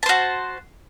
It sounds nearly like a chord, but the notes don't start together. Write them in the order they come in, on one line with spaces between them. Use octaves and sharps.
A5 C5 F#4